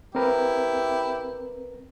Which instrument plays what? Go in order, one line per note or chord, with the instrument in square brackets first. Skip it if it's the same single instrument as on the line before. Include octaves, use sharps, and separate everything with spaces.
[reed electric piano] C4 A#4 B4 [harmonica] E4 G4